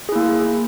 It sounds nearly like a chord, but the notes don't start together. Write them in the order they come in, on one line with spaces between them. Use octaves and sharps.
G#4 E4 A#3